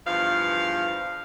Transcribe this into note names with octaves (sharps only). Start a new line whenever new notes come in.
E2 G2 F3 F5